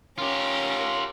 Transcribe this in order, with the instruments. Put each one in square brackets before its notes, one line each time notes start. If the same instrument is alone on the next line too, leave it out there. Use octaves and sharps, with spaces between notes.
[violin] C#4 A#4 [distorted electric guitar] F4 G4